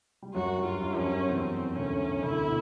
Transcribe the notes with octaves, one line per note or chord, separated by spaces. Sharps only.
G3
F#2 F#3 F#4
G2 G3
F4
F#2 F#3
F3 C#4
F#2 F#3
E2 E3 C4
D2 D3 C#4
D2 D3 E4
B2